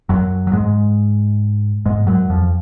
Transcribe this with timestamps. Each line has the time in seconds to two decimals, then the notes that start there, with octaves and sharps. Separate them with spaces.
0.09 F#2 F#3
0.47 F#3
0.53 G#2 G#3
1.86 G#2 G#3
2.07 F#2 F#3
2.30 F2 F3